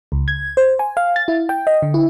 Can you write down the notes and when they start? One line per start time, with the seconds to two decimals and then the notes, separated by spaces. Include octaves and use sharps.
0.12 C#2
0.28 G#6
0.57 C5
0.79 G#5
0.97 F5
1.16 A6
1.28 E4
1.49 G5
1.67 D#5
1.82 D3
1.94 E4